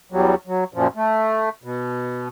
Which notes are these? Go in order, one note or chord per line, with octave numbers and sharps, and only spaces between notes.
E2 F#3 G3
F#3
F#2 A#2 F3
A3
B2